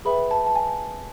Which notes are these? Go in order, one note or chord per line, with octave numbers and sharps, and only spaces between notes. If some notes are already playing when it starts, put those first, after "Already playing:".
G#4 B4 E5 G5 B5
A5
A5
G#5